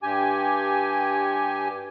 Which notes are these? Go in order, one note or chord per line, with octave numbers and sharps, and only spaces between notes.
G2 G4 G#5